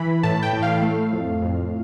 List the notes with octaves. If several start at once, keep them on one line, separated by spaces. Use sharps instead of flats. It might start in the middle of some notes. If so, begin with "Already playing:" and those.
Already playing: E3 B5
A2 A5
G5
A2
F5
A3
F2
F2